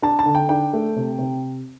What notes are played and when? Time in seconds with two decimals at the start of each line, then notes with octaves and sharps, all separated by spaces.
0.02 D4 A5
0.19 A5
0.26 D3
0.35 G5
0.49 D4 G5
0.73 A3
0.96 C3
1.19 C3